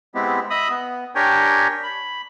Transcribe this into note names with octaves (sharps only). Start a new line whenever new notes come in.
G#3 B3 C4 E4 G4
D#5 E5 B5 D#6
B3
D4 G4 A#4 C#5 G5 G#5
B5